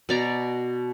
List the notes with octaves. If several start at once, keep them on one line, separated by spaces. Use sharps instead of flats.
B2 D5 A#5